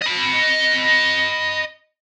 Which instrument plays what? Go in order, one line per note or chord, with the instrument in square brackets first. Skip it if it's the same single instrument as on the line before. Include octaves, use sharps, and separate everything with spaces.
[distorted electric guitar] D#5 B5